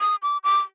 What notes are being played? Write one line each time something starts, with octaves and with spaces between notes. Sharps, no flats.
D#6
D6
D6